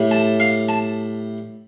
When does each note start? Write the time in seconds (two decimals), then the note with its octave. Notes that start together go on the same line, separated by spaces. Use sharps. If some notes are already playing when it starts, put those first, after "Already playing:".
Already playing: A2 G3
0.11 A5
0.40 F5
0.69 A5